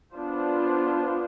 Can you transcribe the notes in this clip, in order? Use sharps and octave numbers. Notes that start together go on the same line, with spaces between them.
B3 D4 F4 C5